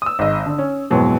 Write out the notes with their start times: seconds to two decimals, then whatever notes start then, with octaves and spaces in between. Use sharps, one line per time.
0.02 D#6 E6
0.19 G#1 D#5
0.46 D3
0.58 C#4
0.91 F2 G#2 B2 E3 F#3